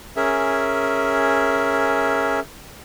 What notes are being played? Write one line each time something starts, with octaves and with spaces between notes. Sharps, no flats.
C#4 G#4 A#4 E5